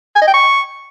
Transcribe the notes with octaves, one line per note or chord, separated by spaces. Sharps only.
G#5
D#5
G5
C#6